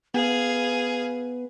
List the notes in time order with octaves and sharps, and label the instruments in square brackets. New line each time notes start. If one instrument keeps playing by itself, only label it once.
[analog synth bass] B3 [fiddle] G#4 F5 [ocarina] B4